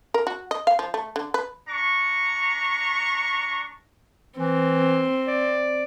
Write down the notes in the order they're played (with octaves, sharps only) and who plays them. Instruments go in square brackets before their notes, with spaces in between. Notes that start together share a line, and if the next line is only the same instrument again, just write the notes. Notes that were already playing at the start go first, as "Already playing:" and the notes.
[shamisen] A#4
F#4
D#5
F5
F3
A3
D3
B4
[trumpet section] D4 A#5 C#6
[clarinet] E3 [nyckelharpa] C4
[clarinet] D5